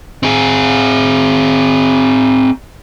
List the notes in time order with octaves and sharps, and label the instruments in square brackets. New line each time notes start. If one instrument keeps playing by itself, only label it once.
[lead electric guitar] C4 G#4